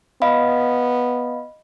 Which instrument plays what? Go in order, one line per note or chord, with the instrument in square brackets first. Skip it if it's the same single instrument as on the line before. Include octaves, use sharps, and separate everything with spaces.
[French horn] B3 [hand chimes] D#5 F5 B5